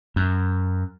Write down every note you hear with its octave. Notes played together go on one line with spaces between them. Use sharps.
F#2